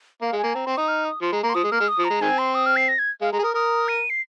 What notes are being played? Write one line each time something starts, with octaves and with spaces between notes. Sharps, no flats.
A#3 F5
G#3
G#5
A#3
C4 A#5
C4 C6
D#4 D#6
F6
D#6
F3 C6
G#3 A#5
A#3 A#5
C6
F3 D#6
G#3
A#3 F6
G#3
D#6
F3
A#5
G#3
D#3 G#3 C4 G#5
C6
D#6
F6
C7
A#6
G#6
G#3 F5
G#3 A#5
G#4
A#4 D#6
A#4 D#6
D#7
C7